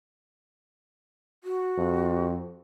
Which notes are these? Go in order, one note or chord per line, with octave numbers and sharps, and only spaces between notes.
F#4
F2